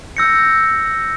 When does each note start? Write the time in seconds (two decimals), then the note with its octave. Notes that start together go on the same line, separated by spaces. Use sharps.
0.17 E6 G6 A#6 C#7